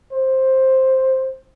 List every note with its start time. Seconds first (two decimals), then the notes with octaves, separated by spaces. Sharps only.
0.13 C5